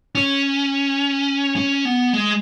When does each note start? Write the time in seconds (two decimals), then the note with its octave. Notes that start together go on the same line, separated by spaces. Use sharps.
0.15 C#4
1.56 C#4
1.85 B3
2.13 G#3